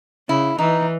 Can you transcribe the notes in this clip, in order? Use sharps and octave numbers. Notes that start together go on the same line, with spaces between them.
C#3 E4
E3 D#4